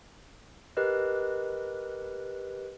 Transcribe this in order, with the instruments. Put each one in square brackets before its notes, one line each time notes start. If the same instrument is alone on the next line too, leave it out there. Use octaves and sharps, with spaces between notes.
[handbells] G4 A#4 B4 D#5 F#6